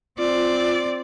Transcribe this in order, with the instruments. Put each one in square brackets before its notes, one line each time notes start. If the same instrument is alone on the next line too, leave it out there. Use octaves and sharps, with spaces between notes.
[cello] C4 D5 [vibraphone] F4